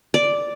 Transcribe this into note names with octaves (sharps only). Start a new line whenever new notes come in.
D5